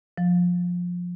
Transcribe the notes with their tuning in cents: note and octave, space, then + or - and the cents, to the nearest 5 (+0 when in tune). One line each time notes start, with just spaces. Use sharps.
F3 +20